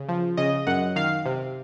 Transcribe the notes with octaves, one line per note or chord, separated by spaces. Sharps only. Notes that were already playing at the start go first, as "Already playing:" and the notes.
Already playing: C#3
F3
C#3 D#5
F#2 F#5
D#3 F5
C3